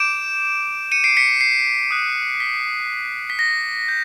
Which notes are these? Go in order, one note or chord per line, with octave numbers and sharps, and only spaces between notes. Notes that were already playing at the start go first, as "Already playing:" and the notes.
Already playing: D6 G6 D7 E7
C#7 D#7
C7 D7
B6 C#7
C7
D#6 F#6
B6
B6
A#6
G6